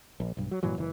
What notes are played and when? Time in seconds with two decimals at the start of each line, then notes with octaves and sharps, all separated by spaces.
0.20 A#1
0.37 B1 G2
0.51 F#3
0.63 G2 A#2 E3 F#3
0.78 F#1 E3